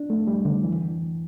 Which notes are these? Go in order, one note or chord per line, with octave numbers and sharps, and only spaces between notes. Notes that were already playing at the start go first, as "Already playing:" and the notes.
Already playing: D4
A3
G3
D3
E3